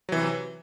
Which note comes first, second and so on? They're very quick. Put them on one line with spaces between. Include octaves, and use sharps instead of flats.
F#3 E3 C3